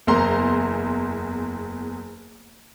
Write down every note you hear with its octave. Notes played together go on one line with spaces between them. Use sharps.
F#1 E2 A#5 C6